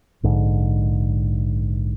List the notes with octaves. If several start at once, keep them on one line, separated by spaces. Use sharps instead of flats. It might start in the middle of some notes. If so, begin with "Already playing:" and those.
A#1 G#2 D3